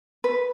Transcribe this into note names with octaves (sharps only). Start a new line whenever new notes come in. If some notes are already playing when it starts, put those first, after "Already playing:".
B4